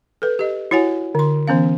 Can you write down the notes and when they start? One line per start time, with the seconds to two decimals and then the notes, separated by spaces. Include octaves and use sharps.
0.22 A4 B4
0.39 G4 D#5
0.71 E4 F#4 C#5 F#5 G#5
1.15 D3 C6
1.48 E3 B3 C#4 F5